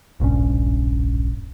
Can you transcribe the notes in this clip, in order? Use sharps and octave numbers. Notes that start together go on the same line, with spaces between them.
D1 A#1 G2 C#4